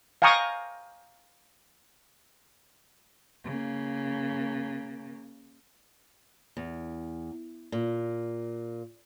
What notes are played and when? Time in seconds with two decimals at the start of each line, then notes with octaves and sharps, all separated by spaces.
0.22 F5 G5 G#5 A#5 C#6 D#6
3.44 C#3 A#3
6.57 E2
7.72 A#2